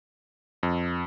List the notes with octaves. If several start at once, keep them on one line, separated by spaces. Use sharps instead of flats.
F2